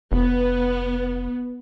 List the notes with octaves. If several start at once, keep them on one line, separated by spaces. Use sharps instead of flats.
F1 B3